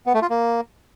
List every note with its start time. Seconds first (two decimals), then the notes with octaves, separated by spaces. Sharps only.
0.06 B3
0.14 A3
0.22 F4
0.30 A#3